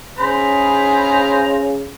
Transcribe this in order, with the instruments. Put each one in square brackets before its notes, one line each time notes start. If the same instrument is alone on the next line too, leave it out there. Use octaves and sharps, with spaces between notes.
[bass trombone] C#3 [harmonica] G#4 C5 A#5 [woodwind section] B5